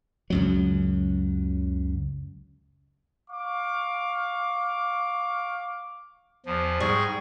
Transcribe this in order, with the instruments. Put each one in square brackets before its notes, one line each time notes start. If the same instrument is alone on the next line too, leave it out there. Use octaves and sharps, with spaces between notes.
[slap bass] C#2 F#2 F#3
[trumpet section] F5 C#6 D6
[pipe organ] E2 F3
[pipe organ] G#2 G#4 C#6 [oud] G3